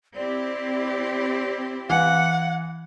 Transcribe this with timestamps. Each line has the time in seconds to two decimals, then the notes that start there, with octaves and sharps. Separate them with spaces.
0.16 C4 E4 G4 D5
1.90 E3 F5 F#5